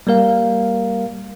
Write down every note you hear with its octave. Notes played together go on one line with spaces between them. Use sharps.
G3 A#3 A#4 F5